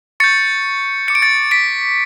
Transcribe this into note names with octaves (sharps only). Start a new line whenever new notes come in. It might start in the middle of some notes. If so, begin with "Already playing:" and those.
C#6 G6 A6 C#7
D6 G6 C#7
D7
A6 C#7
B6 D7